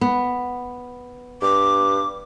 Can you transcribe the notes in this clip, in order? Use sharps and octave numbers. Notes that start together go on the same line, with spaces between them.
B3
G2 D6